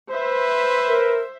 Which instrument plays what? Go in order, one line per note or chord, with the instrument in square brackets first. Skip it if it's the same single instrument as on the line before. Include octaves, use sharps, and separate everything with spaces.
[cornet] B4 [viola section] C5 E5
[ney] A#4